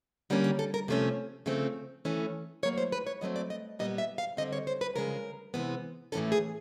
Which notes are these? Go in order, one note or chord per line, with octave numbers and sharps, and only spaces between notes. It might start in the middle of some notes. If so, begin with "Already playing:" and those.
D3 G3 A#3 C#4
G4
A4
A#4
C3 F3 A3 C#4
C#3 F3 A3 C4
E3 A3 C#4
A2 F#3 A#3 C#5
C5
B4
C#5
A#2 F#3 A3 C4 D#5
D5
D#5
A#2 G3 B3 D#5
E5
F5
D3 G3 C4 D#5
C#5
C5
B4
C#3 F3 G#3 A#4
C3 E3 G#3 B3
A2 E3 A3 C#4 A4
G#4